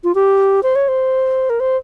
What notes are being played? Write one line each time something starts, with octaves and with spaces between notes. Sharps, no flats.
F4
G4
C5
C#5
C5
A#4
C5